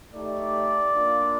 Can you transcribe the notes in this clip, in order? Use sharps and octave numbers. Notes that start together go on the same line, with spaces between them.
A3 D#4 G4 D5
A#3 D4 F4